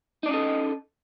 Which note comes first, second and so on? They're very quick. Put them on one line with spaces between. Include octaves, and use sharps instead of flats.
D#4 D5 C#4 D#5 A4